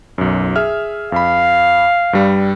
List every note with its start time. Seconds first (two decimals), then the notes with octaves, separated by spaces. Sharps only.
0.18 B1 F#2
0.56 G#4 E5 F6
1.12 F2 F5 B5
2.13 G2 G3